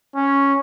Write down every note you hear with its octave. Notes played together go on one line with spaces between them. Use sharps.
C#4